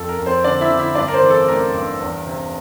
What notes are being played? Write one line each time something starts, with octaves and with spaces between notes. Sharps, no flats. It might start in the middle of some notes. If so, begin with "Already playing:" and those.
Already playing: F2 A4
A#4
F2
C4 C5
D3 D4 D5
E4 E5
D3
E4 E5
G2 D4 D5
A#4
C4 C5
E3
A4
A1 A#4
G2
E2
C3